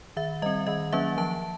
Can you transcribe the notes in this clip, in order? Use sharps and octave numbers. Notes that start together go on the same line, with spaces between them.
D#3 E5
G3 C4 D#5
D#3 D#5
F#3 A#3 C#4 E5
F3 A5